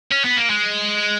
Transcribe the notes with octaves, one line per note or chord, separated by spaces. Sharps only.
C#4
B3
A#3
G#3